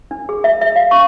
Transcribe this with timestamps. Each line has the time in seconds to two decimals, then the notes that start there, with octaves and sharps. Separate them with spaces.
0.11 D4
0.29 G#4
0.44 E5
0.61 E5
0.76 F5
0.91 C#6